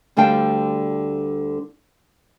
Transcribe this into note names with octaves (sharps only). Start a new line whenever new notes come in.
D2 D3 G3 F5 G5 A5